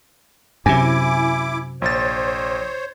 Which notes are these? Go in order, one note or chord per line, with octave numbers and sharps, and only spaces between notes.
F#2 C3 E4 G#5 D6
A#1 C5 C#5 A6